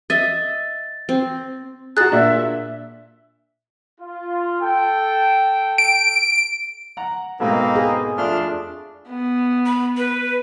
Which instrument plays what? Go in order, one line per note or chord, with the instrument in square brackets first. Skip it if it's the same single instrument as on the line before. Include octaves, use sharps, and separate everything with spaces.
[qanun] D#5 E5 [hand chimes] A6
[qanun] C4
[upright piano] F#4 G#4 [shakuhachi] A#5 [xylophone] F#6 A6
[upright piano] A#2 D4 [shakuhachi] E5
[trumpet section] F4
A4 G5
[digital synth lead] D7
[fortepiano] F#5 A#5
[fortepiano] G#2 B2 A3 [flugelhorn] A#3 [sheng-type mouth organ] C4 D#4 B4
[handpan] G#4
[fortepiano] F2 [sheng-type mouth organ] A3 C6 F6 [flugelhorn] D4
[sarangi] B3
[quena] B5
B4